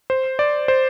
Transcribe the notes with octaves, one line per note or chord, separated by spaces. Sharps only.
C5
D5
C5